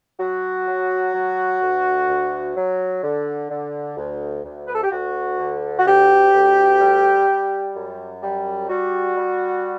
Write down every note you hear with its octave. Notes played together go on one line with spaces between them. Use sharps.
F#3 F#4
F#3
F#3
D2
D2
F#3
D3
D3
D2
D2
B4
A4
G4
D2 F#4
D3
F#4
D2 G4
D2
G3
G3
F#2
G3
G3 F#4
G3